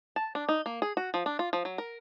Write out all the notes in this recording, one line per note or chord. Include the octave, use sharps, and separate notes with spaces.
A5
D4
D#4
A#3
G#4
F#4
F3
D4
F4
F3
F#3
A#4